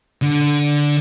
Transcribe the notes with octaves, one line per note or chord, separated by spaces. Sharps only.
D3